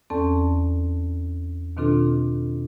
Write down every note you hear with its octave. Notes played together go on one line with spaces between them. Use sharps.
E2 C4 C#4 A4 D5 A5
B2 D#3 C4 D4 F4 A4